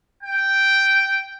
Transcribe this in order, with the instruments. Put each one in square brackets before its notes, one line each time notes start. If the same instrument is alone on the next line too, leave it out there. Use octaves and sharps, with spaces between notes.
[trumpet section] G5